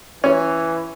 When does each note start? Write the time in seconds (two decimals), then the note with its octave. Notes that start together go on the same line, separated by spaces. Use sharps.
0.24 E3 C#4